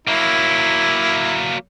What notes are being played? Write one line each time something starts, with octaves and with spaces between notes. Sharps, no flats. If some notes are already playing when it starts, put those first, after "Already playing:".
F#3 A#3 E4